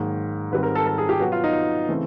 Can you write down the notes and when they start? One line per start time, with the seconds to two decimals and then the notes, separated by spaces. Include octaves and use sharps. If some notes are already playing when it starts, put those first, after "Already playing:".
Already playing: G#2 D#3 F#3 A#3
0.52 G#2 D#3 G3 C4 B4
0.63 A#4
0.75 A4
0.87 A4
0.98 G#4
1.09 G4
1.20 B2 F#3 B3 F#4
1.32 F4
1.44 D#4
1.89 C#3 E3 A3 C4